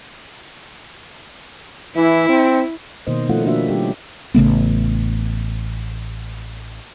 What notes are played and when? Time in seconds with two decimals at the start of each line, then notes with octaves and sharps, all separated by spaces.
1.96 E3 E4
2.29 C4
3.07 B2 D#3 A#3 C5 D#5
3.29 F3 A3 C#4 E4 F4 F#5
3.44 F3 A3 A#3 D4 F#4 E5
3.69 G3 C#4 G4
4.34 A1 C#3 A3 B3